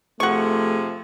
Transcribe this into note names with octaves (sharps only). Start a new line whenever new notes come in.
C3 F3 A3 G#4 F#5 C#6